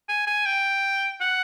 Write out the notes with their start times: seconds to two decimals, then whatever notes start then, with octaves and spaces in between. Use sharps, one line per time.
0.09 G#5
0.27 G#5
0.46 G5
1.21 F#5